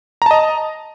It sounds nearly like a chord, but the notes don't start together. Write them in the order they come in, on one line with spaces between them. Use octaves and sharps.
A#5 A5 D#5